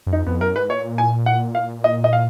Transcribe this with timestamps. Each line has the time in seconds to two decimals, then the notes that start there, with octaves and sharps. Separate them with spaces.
0.07 F#2
0.12 F2 D#4
0.27 F2 B3
0.41 F#2 A#4
0.55 G#2 B4
0.69 A#2 C#5
0.98 G#5
1.26 F#5
1.55 F5
1.84 D#5
2.04 D#5
2.13 F5